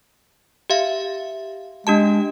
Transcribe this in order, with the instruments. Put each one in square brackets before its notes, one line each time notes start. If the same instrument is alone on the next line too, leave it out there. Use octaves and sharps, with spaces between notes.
[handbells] G4 E5 F5
[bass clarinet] G#3 [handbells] D4 G4 A5